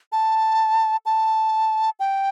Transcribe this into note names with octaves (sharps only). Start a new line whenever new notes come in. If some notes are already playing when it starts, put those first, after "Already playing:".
A5
A5
G5